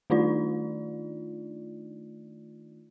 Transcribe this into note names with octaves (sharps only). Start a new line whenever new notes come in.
D#3 A3 D4 D#4 F4 D5